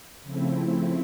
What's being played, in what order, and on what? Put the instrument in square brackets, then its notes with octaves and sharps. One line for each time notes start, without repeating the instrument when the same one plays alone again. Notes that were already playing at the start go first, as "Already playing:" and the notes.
[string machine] C#3 F3 A3 C4 E4